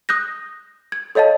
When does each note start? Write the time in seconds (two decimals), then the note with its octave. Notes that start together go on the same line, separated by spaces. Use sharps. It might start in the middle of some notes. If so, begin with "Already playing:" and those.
0.09 D#6 F#6 G6 A#6
0.92 G#6
1.15 A4 C#5 D#5 F5 A5